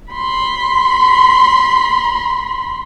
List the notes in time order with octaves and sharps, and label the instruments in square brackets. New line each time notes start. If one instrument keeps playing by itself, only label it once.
[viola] B5 C6